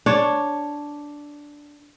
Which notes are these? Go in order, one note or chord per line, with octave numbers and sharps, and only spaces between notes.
D4 C#5